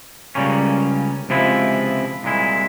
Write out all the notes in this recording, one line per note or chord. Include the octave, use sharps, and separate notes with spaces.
C#2 C#3 G3 A#3 C#4
C#2 C3 F3 G#3 E4
C2 A#2 G#3 E4